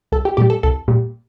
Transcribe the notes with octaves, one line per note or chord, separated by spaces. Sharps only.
C2 A4
G4
A#2 G3 G4
A4
C2 A4
A#2 G3